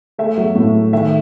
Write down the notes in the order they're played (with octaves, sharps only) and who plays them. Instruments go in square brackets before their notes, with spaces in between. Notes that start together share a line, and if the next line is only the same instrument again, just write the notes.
[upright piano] A3 E5
F#3
A2
A3
D#3 E5